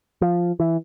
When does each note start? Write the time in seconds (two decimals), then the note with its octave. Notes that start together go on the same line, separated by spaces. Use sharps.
0.21 F3
0.60 E3